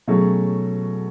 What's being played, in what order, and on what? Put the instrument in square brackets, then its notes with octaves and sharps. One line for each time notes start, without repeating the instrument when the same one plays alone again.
[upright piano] B2 F#3 A3 C#4 G#4